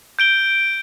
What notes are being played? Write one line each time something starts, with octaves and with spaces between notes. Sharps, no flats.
G6 D7 G7